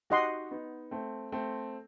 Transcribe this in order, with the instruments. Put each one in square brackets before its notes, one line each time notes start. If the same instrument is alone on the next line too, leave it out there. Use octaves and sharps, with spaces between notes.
[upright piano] D#4 F#4 [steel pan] G4 D#5 F#5 C6
[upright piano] B3 D#4
A3 C4
A3 C4